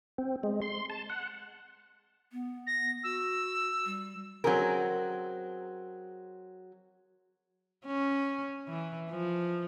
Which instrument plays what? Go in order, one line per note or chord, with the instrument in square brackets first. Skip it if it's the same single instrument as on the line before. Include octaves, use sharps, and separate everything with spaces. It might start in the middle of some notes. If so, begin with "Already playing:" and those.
[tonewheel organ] C4
G#3
C6
A5
F#5
[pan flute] B3
[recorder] A#6
[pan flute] F#4 [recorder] E6
[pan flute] G3
[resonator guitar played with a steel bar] F#3 C4 C#4 G#4 A#4
[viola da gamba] C#4
E3
F3